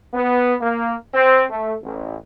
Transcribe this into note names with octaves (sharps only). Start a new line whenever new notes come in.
B3
A#3
C4
A3
A1